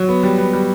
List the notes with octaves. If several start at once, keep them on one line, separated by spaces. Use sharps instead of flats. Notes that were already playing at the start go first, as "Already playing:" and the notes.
Already playing: F#3
B3
G3
B3
G3